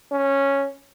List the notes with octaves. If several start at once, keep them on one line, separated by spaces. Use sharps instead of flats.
C#4